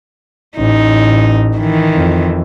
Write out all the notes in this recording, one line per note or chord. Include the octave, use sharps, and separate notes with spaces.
A1 D#4
D#3 E3
F2